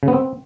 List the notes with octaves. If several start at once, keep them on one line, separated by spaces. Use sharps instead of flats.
C#3
B3
C4